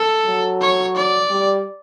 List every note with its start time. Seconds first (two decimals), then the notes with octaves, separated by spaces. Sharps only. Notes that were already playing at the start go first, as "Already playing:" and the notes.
Already playing: A4
0.27 F#3
0.62 C#5
0.97 D5
1.31 G3